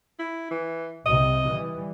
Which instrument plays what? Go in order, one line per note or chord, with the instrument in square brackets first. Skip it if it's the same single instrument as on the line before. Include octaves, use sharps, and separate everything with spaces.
[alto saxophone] E4
E3
[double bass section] C2 C3 [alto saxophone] D#5
[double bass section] E3 G3